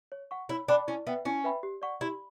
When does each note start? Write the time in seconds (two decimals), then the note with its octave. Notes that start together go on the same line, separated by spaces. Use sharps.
0.12 C#5
0.31 F#5 C#6
0.49 E4 C#5
0.68 D4 G5 B5 D6
0.88 C#4 E4
1.07 B3 B4 E5 G5
1.25 C#4 E4
1.44 B4 E5 G5 B5
1.63 G4
1.82 D5 F#5 C#6
2.01 E4 G4